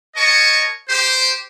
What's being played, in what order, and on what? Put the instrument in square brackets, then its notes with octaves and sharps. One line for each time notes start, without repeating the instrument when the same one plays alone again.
[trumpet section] A#4 C#5 D#5 A5 C#6
G4 C5